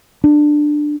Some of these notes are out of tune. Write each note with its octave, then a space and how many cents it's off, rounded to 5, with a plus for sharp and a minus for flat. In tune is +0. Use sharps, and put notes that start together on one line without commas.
D4 +15